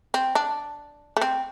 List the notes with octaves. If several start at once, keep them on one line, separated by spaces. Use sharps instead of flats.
C4
D4
A3
C4